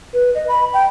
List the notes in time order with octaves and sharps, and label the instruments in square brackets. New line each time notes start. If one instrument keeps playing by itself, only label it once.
[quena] B4
D#5
B5
G5